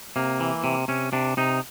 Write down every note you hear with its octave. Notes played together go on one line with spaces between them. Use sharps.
C3 A#3
E3
C3
C3 C#4
C3 D4
C3 D#4